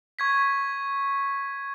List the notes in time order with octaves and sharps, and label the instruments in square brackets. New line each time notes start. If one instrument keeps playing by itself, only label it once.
[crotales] C#6 G#6 B6